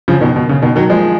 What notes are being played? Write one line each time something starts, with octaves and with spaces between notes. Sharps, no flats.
C#3 F3
B2 D#3
B2
C#3
B2 D#3
D#3 F#3
F3 G#3